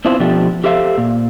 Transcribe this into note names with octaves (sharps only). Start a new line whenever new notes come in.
B3 C4 D4 E4 F4 C5
B2 F3 A3 D4 G4
G4 A4 C5 E5 F5
A#2